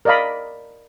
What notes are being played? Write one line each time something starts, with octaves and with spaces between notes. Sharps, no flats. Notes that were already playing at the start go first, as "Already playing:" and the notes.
A#4 D5 D#5 F5 B5